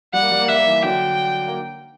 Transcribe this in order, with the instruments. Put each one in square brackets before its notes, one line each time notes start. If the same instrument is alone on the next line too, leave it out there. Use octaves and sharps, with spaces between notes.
[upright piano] G3 [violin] F#5
[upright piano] A#3
G3
A#3
[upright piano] G3 [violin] E5
[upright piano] A#3
E3 G3
[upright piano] D3 F#3 [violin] G5
[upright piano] A#3